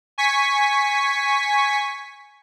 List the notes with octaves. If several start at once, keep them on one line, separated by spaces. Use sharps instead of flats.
G#5 C#6 B6